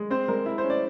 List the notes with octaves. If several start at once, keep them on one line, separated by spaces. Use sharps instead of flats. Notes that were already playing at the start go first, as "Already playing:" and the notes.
Already playing: G#3
C4 C5
G#3 A#4
E4
C5
C#4
D5